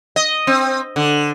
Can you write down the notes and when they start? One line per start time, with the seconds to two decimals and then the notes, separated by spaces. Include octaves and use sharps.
0.16 D#5
0.47 C4
0.96 D3